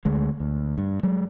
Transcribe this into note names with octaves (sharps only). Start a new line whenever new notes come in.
D2 D3 G#3
D2
G2
F#3 G#3